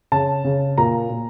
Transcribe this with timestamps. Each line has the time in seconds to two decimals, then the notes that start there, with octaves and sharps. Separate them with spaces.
0.12 C#3 A5
0.45 C#3
0.78 A#2 A#5
1.10 A#2